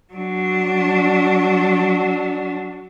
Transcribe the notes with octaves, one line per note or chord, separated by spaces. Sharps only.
F#3 D4